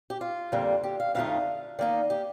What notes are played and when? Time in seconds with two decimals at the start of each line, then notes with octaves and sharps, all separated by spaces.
0.10 G4
0.21 F4
0.52 F2 D3 G3 A#3
0.83 G4
1.00 F5
1.15 F2 D3 F3 A3 D#4 F5
1.79 D#3 A#3 D#4 D5
2.10 G4